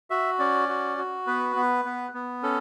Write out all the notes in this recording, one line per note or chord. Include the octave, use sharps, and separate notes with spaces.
F#4 E5
C#4 D5
F#4
F#4
B3 B4
B3
B3
B3
C#4 A4